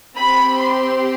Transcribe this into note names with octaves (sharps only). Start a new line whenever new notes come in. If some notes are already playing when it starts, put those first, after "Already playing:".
C4 G4 B5
C6